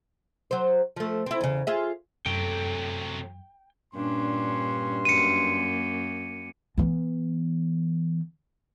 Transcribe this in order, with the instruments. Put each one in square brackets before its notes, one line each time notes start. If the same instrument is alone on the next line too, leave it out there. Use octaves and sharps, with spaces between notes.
[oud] F#3 C5
F3 A3
C4 E4
E2 C#3
F4 G#4 E5
[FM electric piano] F#2 [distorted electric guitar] C3 F#3 [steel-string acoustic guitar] A3 A4 [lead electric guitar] G5
[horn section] G2 C6 [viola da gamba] A#2 C#4 D4
[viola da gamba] F#2 A#3 [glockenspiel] C#7 D#7
[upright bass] E3 B3